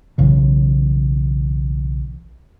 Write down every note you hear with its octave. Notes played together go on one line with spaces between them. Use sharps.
B1 C#3 E3